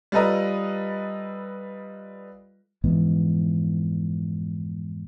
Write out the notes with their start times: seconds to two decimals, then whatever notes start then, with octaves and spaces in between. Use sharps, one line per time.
0.12 G3 F4 A4 B4 D#5 A#5
2.84 F2 G#2 E3 B3